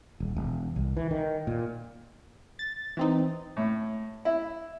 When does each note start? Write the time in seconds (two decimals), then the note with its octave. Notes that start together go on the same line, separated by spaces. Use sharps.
0.20 D#1
0.37 E1
0.76 C2
0.97 E3
1.11 D#3
1.47 A#2
2.59 A6
2.97 E3 C4 D#4
3.57 A2
4.25 E4